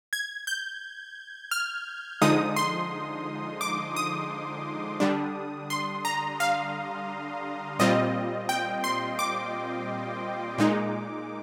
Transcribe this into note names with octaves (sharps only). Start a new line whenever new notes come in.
G#6
G6
F6
D3 F3 G#3 D#4 D#6
C6
D6
D#6
D3 G3 D4
C6
A#5
F5
A#2 G3 C4 F4 D#5
G5
C6
D6
A#2 G#3 D#4